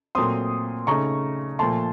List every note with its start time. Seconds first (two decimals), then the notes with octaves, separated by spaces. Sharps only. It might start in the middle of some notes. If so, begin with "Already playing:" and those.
0.15 A#2 F#3 A3 C4 C6 D#6
0.87 C#3 A3 D#4 A#5 C#6
1.59 A#2 F3 A3 A5 C6